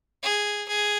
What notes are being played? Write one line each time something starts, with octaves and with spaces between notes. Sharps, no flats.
G#4
G#4